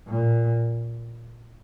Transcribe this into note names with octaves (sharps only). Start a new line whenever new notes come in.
A#2